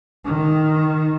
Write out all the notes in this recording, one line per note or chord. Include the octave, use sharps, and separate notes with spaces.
D#3